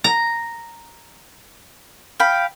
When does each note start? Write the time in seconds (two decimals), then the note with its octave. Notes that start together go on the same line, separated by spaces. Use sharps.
0.04 A#5
2.20 F5 G5 B5